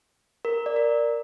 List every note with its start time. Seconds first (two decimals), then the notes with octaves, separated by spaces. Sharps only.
0.45 A#4
0.66 D5
0.76 A#4